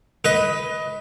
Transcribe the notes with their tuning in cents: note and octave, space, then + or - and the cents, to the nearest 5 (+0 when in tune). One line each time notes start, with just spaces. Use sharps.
B4 +0 D#5 +20